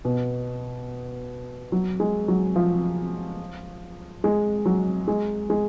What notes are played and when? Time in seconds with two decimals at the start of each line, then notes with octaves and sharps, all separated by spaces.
0.05 B2
1.72 F#3
2.00 G#3
2.28 F#3
2.56 F3
4.24 G#3
4.66 F#3
5.08 G#3
5.50 G#3